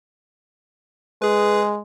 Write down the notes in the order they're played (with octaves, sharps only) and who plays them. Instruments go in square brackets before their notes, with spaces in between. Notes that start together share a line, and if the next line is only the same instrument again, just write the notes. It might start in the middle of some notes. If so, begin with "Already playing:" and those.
[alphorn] G#3 [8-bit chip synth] G#4 B4